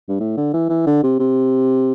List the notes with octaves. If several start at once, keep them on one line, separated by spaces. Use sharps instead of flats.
G2
A2
D3
E3
E3
D3
C3
C3